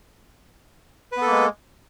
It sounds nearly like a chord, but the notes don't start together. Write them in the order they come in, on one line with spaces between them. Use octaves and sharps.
B4 B3 A4 A#3 G#3